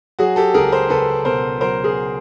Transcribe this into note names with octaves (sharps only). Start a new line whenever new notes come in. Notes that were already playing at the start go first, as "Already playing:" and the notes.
F#3 F#4 G#4
G4 A4
C#2 G#4 A#4
A#4 C5
C#2 A4 B4
B2 A#4 C5
F#3 A#4 C5
G#4 A#4